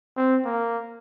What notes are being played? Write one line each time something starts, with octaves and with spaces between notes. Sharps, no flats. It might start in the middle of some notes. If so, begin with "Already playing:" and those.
C4
A#3